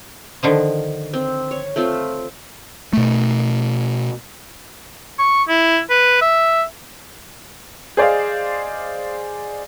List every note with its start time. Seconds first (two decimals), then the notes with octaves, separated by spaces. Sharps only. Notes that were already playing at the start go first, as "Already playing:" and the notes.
0.43 D3 D#3 F3
1.13 C4
1.51 C#5
1.76 A3 C4 F4
2.93 B2 A3
5.19 C#6
5.48 E4
5.90 B4
6.21 E5
7.97 G#4 C5 D5 D#5 F5